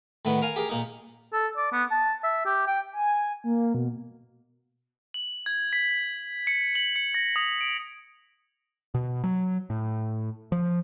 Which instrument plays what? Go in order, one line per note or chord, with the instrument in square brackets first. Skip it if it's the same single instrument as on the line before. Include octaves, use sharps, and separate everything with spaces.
[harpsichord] A2 D#3 B3
A#4 F5 G#5
G4 G#4 A#4
A#2 A#3 D#4
[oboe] A4
D5
B3
A5
E5
G4
G5
[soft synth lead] G#5
A#3
B2
[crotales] F#7
G#6
B6
C#7
F#7
C#7
A#6
D#6
D7
[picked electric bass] B2
F#3
A2
F3